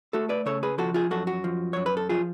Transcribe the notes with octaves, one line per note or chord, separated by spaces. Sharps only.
A3 F#4 A4
B4 D5
C#3 A4 C#5
G#4 B4
F3 F#4 A4
F4 G#4
F#2 F#4 A4
F#4
F3
F#2 C#5
B4
A4
F3 F4 G#4